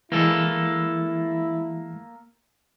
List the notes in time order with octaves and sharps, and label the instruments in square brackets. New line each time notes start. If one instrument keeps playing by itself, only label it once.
[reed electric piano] E3 G#3 [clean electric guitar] A#3 A4 [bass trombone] E4